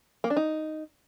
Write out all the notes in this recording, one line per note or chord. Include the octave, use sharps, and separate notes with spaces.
A#3
D4
D#4